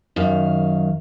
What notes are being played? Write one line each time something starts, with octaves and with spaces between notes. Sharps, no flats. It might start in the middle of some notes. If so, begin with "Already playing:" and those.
F#2 D#3 F5